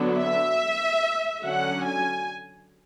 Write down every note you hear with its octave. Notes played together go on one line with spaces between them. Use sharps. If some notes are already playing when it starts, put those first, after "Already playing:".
Already playing: D3 F#3 B3 D4
E5
D3 F#3 C#4 F#5
G#5